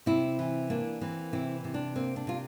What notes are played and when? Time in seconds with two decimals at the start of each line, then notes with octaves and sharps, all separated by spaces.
0.06 C3 C4 E4
0.39 E3
0.70 A#3 D4
1.01 E3 C4
1.32 C3 C4 E4
1.64 C3
1.74 D4
1.96 A#3 C4
2.16 D4
2.27 C3 F4